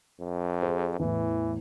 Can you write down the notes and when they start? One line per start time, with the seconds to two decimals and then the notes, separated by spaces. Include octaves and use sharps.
0.20 F2
0.63 G#4 C5
0.99 E2 A2 E3